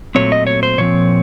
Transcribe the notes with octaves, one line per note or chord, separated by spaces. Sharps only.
A#2 F#3 A3 C4 C#5
D#5
C#5
C5
A#2 F3 C4 C#5